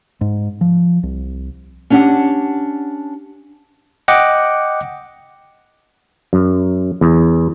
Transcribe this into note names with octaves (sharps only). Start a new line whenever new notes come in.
G#2
F3
C2
C#4 D4 G4 F#5
D#5 F#5 G5 D6
F#2
E2